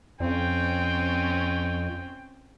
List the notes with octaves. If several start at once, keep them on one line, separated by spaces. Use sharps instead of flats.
F2 C4 C#4 G5